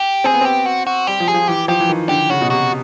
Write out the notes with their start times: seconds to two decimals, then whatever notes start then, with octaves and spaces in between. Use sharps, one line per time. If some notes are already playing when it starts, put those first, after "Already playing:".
Already playing: G4
0.24 C4 G#4
0.34 B3
0.41 C4 G4
0.66 F#4
0.87 F#4
1.07 G3 G4
1.20 F3
1.28 G#4
1.34 F3
1.48 E3 G4
1.68 F3 G4
1.80 E3
1.89 D#3
2.09 D3 G4
2.29 C#3 F#4
2.41 B2
2.50 C3 F#4